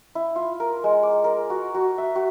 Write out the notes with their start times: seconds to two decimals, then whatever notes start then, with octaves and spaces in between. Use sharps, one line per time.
0.15 E4
0.36 F4
0.60 A#4
0.84 G#3
1.03 D6
1.24 A#4
1.50 F#4
1.74 F#4
1.98 E5
2.15 F#4